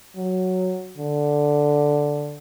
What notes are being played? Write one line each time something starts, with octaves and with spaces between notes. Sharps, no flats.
F#3
D3